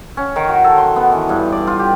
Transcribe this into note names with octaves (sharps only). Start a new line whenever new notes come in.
C#4
D#3
F#4
A4
C6
B3
E3
G2
D5
F4
G4